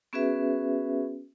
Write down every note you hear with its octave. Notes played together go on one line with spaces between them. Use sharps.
B3 C#4 F#4 G#4 B4 E5